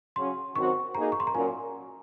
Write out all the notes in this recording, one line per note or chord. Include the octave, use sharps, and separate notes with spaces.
C#3 F#3 C#4 C6
D#3 F#3 C4 F#4 C5 C#6
A#3 D#4 G#4 A#5
C#6
C6
A#5
A#2 F#3 C#4 F4 A#4 G#5